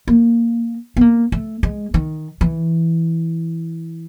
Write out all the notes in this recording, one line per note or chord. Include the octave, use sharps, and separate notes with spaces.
A#3
B3
A#3
A3
G#3
D#3
E3